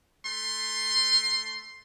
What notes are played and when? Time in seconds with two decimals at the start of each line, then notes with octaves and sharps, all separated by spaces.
0.25 A3 C6